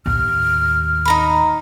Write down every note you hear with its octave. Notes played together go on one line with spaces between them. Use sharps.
D#2 A2 F6
D#4 A#5 B5